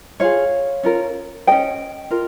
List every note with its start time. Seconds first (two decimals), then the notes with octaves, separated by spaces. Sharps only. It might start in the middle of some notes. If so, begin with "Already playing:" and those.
0.20 F4 G#4 C#5 F5
0.83 C#4 F4 A#4
1.47 C#4 G#4 D#5 G5
2.11 F4 A#4